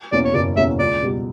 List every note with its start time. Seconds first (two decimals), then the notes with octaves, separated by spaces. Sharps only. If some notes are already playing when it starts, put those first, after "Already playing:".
0.12 E2 B2 A#3 C#4 D5
0.25 C#5
0.34 F#1 D5
0.57 E2 B2 A#3 C#4 E5
0.79 C#2 D5
1.02 B2 G3